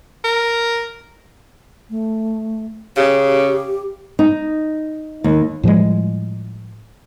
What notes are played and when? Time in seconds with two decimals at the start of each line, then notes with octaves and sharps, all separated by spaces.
0.24 A#4
1.90 A3
2.97 C#3 G4
4.19 D#4
5.24 D#2
5.64 A2 F3 G3 G#3